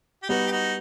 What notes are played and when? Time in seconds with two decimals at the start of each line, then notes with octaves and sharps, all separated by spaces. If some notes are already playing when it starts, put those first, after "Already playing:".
0.23 G4
0.29 G3 B3 D#4 F#4
0.47 G4
0.51 D#4 F#4